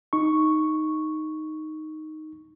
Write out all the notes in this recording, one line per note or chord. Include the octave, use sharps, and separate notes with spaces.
D#4 C#6